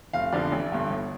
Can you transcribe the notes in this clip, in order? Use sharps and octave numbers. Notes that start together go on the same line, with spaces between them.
F1 F5
F2 D3 F3 D5
A1
G2 D3
G1